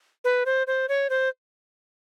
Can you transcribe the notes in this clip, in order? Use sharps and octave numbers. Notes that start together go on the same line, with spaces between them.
B4
C5
C5
C#5
C5